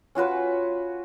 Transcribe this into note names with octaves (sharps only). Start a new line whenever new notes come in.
C#4 F4 F#4 B4